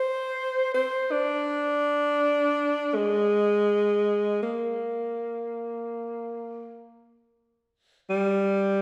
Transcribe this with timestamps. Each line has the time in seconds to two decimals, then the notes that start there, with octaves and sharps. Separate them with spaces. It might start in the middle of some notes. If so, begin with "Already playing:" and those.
Already playing: C5
0.75 C5
1.12 D4
2.95 G#3
4.43 A#3
8.10 G3